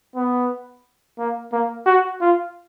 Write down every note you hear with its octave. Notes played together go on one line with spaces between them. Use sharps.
B3
A#3
A#3
F#4
F4